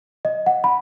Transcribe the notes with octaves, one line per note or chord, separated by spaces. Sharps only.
D#5
F#5
B5